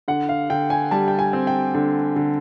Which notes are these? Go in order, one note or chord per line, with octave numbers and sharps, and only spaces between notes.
D3 F#5
F5
D3 G5
G#5
G3 A5
G5
G#5
C4
G5
D3 G5
D3